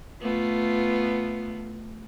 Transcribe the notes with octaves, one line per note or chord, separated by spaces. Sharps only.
A3 B3 F4